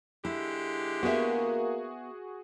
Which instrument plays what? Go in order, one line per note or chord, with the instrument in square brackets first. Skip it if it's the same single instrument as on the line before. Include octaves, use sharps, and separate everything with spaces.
[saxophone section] D3 G#3 G4 [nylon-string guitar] E4
[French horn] A#3 [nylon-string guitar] B3 E5 [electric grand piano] F#4 G#4